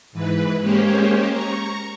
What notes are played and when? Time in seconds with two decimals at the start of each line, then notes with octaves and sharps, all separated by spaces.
0.12 G#2 E3 B4
0.62 G#3 A#3 C#4 G4 C5 C#5
1.31 A#5 C#6